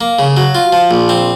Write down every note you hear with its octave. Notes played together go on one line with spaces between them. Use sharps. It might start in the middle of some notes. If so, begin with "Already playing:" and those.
A#3
C#3
F#3
F4
F3
A#1
C4